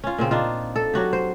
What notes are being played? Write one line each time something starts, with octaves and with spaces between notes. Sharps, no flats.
C#4 F4
A#2 C#3 C4
D4 D#4 F4
A4
F#3 F#4 G4
C5